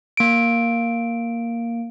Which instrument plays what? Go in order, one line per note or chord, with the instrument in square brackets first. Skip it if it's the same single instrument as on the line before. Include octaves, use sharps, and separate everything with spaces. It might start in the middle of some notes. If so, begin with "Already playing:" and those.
[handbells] A#3 D7